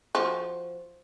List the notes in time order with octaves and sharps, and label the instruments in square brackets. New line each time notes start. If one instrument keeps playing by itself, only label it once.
[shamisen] F3 F#4